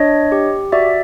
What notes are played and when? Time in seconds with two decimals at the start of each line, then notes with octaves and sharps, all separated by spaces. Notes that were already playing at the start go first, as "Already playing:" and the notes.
Already playing: D4 C#5 D#5
0.32 G4
0.72 F#4 D5 E5